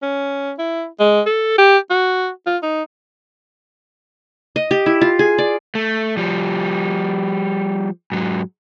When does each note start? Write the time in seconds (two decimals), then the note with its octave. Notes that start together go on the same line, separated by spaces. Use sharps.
0.02 C#4
0.58 E4
1.00 G#3
1.26 A4
1.58 G4
1.90 F#4
2.47 F4
2.63 D#4
4.56 D#5
4.71 G4
4.86 E4
5.01 F4
5.19 G#4
5.38 D5
5.75 A3
6.17 F3 G3
8.12 G#2 F#3